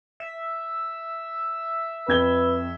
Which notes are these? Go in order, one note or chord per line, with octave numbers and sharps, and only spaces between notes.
E5
F2 B4 G#6 G7